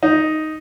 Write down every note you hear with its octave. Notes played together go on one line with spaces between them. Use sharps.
D#4